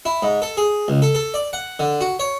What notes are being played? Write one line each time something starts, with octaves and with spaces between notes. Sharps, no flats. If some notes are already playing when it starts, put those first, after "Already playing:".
E4
G#2
A4
G#4
C#2
A4
A4
D5
F#5
D3
F#4
C#5